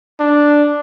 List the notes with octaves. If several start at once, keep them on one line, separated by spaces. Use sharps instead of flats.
D4